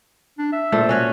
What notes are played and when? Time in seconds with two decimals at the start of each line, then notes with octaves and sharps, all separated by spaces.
0.38 D4
0.53 E5
0.72 A#2 A3 C5
0.89 C#4 F#4 C#5